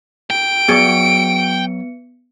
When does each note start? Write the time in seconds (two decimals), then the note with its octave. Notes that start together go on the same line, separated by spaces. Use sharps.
0.30 G5 D7
0.68 F#3 B3 G#4 D5 C#7